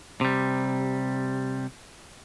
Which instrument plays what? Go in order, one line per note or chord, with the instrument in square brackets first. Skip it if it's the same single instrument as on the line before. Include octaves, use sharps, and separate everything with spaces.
[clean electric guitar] C3 G3